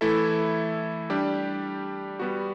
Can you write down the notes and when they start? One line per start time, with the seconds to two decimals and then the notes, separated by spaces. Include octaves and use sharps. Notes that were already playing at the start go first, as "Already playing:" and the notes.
0.01 E3 A3 E4 A4 E5
1.10 G3 D4 G4
2.20 G3 B3 F#4